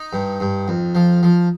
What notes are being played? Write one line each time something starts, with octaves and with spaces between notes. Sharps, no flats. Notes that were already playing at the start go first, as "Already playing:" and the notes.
Already playing: D#4
G2
G2
F2
F3
F3